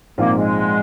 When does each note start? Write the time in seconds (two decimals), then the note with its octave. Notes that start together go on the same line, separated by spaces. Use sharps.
0.18 A#1 G#2 F3 A#3 C4 F4
0.37 G#3